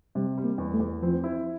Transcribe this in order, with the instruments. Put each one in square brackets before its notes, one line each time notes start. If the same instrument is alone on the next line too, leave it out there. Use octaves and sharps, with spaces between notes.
[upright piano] C3 [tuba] G3
[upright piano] G3
[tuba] A#3
[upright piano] E2
[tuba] A3
[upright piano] E2
[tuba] F3 [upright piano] C4
[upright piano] E4